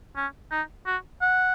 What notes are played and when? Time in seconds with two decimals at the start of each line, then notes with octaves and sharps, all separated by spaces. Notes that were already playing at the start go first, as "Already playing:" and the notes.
0.16 C#4
0.51 D#4
0.86 F#4
1.21 F#5